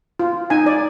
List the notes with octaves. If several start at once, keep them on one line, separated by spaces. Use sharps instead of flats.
F4
D#4 G#5
D5